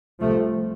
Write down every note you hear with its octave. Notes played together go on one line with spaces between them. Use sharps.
C2 C3 F3 A3